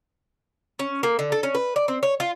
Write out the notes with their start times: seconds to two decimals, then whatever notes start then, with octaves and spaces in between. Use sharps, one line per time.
0.79 C#4
1.03 A#3
1.19 D3
1.32 A4
1.43 C#4
1.55 B4
1.76 D5
1.88 C4
2.03 C#5
2.20 F4